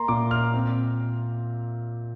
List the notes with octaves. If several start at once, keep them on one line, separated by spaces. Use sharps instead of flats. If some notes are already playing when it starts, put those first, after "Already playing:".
Already playing: A#3 A#5 C6
A#2 D6
F6
C4